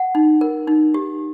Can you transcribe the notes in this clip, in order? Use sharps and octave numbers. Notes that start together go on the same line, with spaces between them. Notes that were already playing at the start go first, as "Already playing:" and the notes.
Already playing: F#5
D#4
A#4
D#4
G4